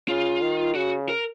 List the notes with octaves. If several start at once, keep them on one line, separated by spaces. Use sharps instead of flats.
C#3 F4
D#3
C#3 F#4
A#4